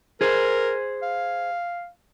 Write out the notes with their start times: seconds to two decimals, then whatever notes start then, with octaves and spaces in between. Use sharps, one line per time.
0.21 G#4 A#4 C5
1.02 F5